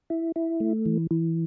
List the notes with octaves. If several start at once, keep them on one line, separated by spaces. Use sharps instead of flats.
E4
E4
A3
E3
E3